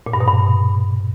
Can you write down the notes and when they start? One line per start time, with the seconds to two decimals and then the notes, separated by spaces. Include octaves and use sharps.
0.06 A#2
0.13 G2
0.20 B2
0.27 G2